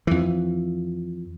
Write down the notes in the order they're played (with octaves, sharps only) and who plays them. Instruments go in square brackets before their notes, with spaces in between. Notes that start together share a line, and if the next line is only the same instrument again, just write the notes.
[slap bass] F2 E3